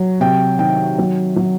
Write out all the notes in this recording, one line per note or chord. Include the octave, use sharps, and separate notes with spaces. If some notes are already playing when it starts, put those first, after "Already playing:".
Already playing: F#3
C3 G5
D#3 G5
F#3
F#3